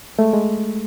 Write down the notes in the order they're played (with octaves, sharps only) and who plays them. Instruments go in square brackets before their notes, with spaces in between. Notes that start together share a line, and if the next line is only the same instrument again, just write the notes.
[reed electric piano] G#3 A3
G#3